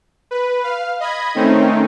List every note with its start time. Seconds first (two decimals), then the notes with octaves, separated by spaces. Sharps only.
0.31 B4
0.64 F5
1.00 D#5 B5 G#6
1.35 D#3 A3 C4 C#4 D#4